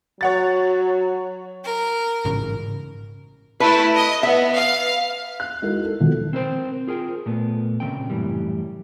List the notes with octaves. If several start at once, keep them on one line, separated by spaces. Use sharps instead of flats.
F#3 C#5 F#5 A6
A#4
A1 G#2 C#3
A3 E4 B4
D#5
B3 E5
F5
F#6
G#3 D#4 E4 F#4 A4 A#4
A4
B2 D#3 F3
C4 A#4 C5 G5
F4 G#4 A#4 G5
A#2 A3 B3
A#2 C#3 F3 C4 G5
F#2 A2 E3 G3